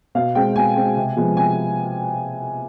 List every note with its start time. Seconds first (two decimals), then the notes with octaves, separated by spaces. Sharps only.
0.15 B2 F5
0.35 G#3 C4 G5
0.56 B2 G#5
0.76 G#3 C4
0.96 C3
1.17 F3 G#3 B3
1.37 C3 G#5